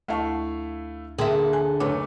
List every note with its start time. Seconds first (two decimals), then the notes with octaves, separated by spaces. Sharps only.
0.08 D2 A3 E4 F5 A5 C#6
1.18 D3 A#3 G#4 E5 G5 C6
1.53 G#5 F#6
1.80 F#1 A3 B4 C#5 D6